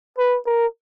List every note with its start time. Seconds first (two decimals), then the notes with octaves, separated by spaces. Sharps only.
0.18 B4
0.46 A#4